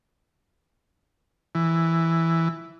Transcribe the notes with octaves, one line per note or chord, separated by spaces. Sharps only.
E3